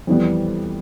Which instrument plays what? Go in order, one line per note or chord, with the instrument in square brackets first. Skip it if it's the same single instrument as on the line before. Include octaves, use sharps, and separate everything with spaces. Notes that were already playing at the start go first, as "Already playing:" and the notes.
[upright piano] F2 E3 G3 B3